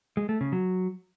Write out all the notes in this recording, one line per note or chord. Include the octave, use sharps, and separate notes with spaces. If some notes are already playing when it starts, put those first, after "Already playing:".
G#3
A3
C#3
F#3